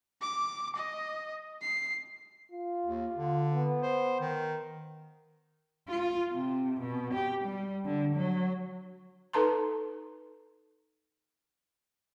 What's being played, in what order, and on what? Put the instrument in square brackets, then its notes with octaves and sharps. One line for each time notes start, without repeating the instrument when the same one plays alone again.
[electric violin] D6
D#5
C7
[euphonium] F4
[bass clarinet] D#2
D3
[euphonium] B3
[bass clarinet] C5
D#3
[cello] F4
C3
B2
G4
G3
D3
F#3
[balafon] D#4 A4 B4 A5 A#5 C6